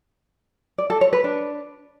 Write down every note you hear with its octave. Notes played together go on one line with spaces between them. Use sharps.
D5
A4
C#5
B4
D4